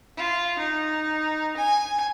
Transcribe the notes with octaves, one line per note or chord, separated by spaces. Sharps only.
F4
D#4
G#5